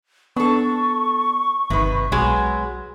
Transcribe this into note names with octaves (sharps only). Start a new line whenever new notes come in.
B3 D4 A4 C#6
G1 C3 D#3 B4
B1 F#3 G#3 B3